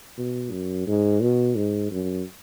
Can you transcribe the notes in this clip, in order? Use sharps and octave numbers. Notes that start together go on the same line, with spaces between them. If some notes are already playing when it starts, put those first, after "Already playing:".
B2
F#2
G#2
B2
G#2
F#2